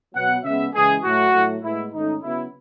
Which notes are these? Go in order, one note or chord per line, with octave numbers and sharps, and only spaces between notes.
B2 F#3 B3 F#5
C#3 G#3 B3 E5
C#3 E3 G#3 G#4
A2 F#3 A3 F#4
A2 F#3 A3
A2 G#3 B3 E4
G#2 D#3 A3 C#4 D#4
C#3 F#3 B3 E4